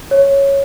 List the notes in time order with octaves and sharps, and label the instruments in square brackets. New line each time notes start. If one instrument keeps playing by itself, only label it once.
[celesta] C#5